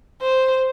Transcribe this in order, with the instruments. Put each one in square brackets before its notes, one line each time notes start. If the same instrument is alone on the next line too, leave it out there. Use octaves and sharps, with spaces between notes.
[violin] C5